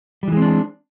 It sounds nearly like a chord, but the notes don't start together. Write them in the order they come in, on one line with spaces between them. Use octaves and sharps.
G3 E3 G#3 C4 D4